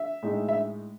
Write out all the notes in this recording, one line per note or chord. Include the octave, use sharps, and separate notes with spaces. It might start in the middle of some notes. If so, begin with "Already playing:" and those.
Already playing: E5
A2 G#3 D#4
E5